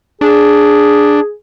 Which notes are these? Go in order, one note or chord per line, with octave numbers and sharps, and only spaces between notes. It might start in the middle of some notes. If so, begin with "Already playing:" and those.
D4 G#4